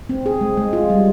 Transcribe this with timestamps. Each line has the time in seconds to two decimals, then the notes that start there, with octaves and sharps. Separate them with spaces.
0.09 C4
0.26 G#4
0.41 G#3
0.57 G#3
0.73 F4
0.90 G3